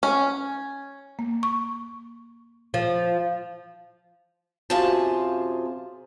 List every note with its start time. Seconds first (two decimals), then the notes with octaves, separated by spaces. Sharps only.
0.03 C#4
1.19 A#3
1.43 C#6
2.74 F3
4.70 F#2 C3 F4 G#4 C5 A5